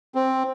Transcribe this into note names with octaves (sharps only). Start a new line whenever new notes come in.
C4